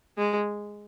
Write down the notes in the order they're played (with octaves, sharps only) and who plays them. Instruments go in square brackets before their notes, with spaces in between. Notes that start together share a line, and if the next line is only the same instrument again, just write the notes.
[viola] G#3